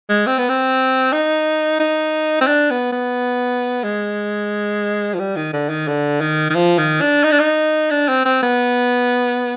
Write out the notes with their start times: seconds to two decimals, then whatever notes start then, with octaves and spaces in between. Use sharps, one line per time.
0.09 G#3
0.26 C4
0.38 B3
0.49 C4
1.12 D#4
1.80 D#4
2.41 C4
2.47 D4
2.70 B3
2.92 B3
3.83 G#3
5.14 F3
5.19 G3
5.36 D#3
5.53 D3
5.70 D#3
5.87 D3
6.21 D#3
6.50 D#3
6.55 F3
6.78 D#3
7.01 D4
7.24 D#4
7.31 D4
7.39 D#4
7.91 D4
8.08 C4
8.26 C4
8.42 B3